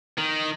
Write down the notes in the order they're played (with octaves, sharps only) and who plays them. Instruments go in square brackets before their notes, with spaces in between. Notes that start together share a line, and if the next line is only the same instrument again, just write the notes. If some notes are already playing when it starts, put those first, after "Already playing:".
[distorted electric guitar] D#3